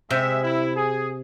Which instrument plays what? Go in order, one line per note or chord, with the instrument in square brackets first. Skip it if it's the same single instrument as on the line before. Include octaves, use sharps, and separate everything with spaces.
[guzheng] C3 [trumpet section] G#3 E5
[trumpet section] E4
G#4